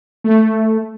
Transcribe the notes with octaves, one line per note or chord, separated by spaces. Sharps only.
A3